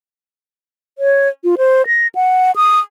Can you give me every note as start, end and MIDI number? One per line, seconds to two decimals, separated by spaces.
0.98 1.28 73
1.44 1.55 65
1.58 1.86 72
1.87 2.07 94
2.15 2.51 78
2.56 2.80 87